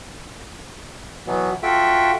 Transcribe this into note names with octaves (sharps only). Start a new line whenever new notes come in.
B2 E3 F#3 B3
F4 F#4 A4 E5 G5